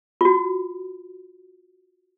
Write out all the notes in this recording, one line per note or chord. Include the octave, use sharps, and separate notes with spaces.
F4 F#4